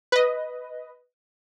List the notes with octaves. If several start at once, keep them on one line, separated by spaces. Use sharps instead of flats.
B4 D#5